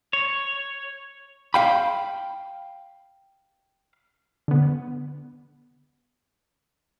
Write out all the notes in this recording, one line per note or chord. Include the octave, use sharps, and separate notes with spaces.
C#5
F5 G5 B5
D3 B3